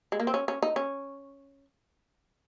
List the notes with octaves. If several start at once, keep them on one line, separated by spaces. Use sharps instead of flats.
G#3
A#3
C4
C#4
C#4
D#4
C#4